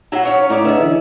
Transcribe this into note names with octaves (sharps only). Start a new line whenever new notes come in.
F#3 D#4 E4 F#5
C#4 C#5 F5
A2 C#4 D#4 E4 D5 A#5 D6
D3 G#4 B4 D#5 E5
E3